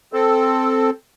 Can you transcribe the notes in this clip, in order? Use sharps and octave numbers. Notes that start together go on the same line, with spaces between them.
C4 A4